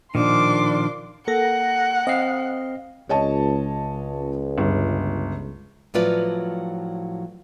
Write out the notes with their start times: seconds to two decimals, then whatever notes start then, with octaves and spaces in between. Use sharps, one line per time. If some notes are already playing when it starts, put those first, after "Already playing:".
0.15 A#2 D#3 F3 D4 C6 D6
1.27 A#3 A4 F#5 A#6
2.07 C4 D#5 F5 C7
3.09 C#2 C#5 D#5 A5
4.58 G1
5.94 A2 F3 F#3 F4 B4 D5